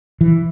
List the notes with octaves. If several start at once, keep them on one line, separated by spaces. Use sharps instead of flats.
E3